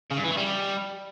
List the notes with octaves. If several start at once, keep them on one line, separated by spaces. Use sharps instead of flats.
C#3
G2
E3
A3
G3